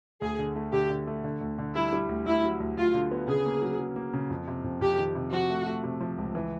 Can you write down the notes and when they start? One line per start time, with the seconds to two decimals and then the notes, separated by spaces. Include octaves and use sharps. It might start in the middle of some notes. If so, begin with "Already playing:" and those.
0.22 D2 G#4
0.39 D3
0.56 A3
0.73 D3 G4
0.90 D3
1.07 A3
1.24 D3
1.41 D2
1.58 D3
1.74 G3 E4
1.93 G3
2.09 D2
2.26 D2 E4
2.44 F#3
2.60 D2
2.77 D2 F4
2.94 D3
3.11 B3
3.28 C#3 G#4
3.46 A#3
3.62 F#3
3.79 F#3
3.96 A#3
4.13 C#3
4.30 F2
4.47 C3
4.64 F2
4.81 F2 G4
4.98 D#3
5.15 C3
5.32 F3 F#4
5.50 A3
5.66 A3
5.84 C3
6.01 F3
6.18 C#2
6.35 E3